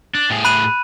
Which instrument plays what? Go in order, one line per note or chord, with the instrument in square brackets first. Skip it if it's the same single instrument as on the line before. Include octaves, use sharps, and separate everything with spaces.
[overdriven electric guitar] D4
A2 G#4
[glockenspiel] B5 F#6 D#7